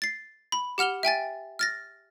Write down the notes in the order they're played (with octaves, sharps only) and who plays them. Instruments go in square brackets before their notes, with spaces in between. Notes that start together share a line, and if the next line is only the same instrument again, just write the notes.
[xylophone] A6 C7
B5
G4 F#5 F6 F7 G7
E5 G5 G#5 A6
F6 A6 A#6